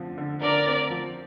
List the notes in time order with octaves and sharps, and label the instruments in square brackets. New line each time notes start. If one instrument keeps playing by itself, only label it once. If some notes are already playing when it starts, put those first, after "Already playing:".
Already playing: [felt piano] D3 F3 C4
D3
[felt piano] D3 [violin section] A#4 D5
[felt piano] C4
F3